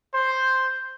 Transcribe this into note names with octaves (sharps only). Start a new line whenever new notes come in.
C5